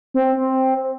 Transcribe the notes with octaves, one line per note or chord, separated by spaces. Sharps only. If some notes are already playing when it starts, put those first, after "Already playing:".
C4